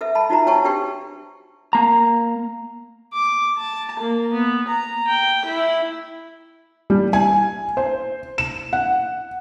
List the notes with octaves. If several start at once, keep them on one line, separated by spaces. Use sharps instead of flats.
A4 B4 E5
A5 B5
D#4 F4 F#4 C5 E5 A#5
F#4 B4 C#5 G5 A5 C#6
D4 G4 B4 G5 C#6
A#3 A#5
D6
A5
A#3
B3
A#5
G5
E4
G3
G#5
C5
E7
F#5